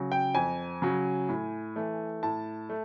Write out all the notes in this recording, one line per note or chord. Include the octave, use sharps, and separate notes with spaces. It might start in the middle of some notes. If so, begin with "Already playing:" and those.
Already playing: C#3 F#3
G5
F2 G#5
C#3 F#3
A2
E3 A3
A2 A5
A3